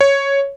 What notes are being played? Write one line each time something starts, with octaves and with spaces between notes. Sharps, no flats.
C#5